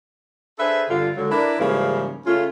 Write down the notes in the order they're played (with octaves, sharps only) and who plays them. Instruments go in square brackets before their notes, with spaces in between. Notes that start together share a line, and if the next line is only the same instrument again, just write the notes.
[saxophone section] D4 G#4 A4 B4 C5 E5
G2 D3 F4
D3 F#3 G#3
D4 E4 A#4 B4 D5
G#2 C#3 E3 F3 G3 A#3
C#3 A3 C#4 F4